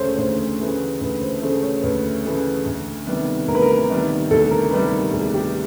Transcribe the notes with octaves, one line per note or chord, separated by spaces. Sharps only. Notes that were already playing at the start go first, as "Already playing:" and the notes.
Already playing: D2 C#3 E3 A3 C5 C#5
D2 C5
C#3 E3 A3
D2 B4
C5
C#3 E3 A3 C5
C#5
D2 B4
C#3 E3 A3
D2
C3 D#3 G3 B3
D2 A#4
B4
A#4
C3 D#3 G3 B3
D2 A4
A#4
C3 D#3 G3 B3 B4
A#4
D2 G#4
G4